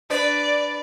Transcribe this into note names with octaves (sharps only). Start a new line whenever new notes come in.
D4 B4 D5